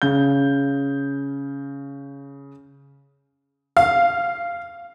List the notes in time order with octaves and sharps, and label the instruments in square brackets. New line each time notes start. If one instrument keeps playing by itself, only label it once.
[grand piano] C#3 G6
[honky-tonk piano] F5